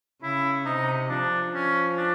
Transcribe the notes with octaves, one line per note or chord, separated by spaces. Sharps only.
C#3 E4
C3 D#4
F3 D4
C#4
D4